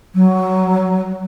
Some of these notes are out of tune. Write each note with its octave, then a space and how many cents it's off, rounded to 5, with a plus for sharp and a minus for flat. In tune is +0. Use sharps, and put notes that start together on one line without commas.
F#3 +10